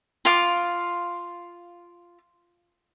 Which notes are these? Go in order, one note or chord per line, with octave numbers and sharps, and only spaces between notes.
F4 F5 D6